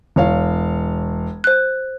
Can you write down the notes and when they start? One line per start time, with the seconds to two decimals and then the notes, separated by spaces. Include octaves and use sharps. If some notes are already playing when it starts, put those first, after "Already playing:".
0.16 E1 C#5 F5
1.44 C5 F#6